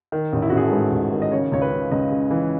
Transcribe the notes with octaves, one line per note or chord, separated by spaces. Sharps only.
D#3
A1
E4
A1 F#4
G#4
A4
G#2 B4
A1
D#3
D#5
C#3 C#5
C#2 C#5
B4
C#3
C#2 D#5
C#3
E3